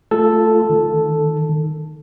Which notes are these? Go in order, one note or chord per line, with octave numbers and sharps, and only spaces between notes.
A3 F4 A4
D#3